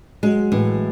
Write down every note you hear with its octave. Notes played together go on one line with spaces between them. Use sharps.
F#3 G#3
A2 E3